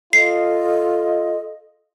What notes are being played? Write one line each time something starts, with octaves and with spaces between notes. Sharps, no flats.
F4 A4 D#5 C7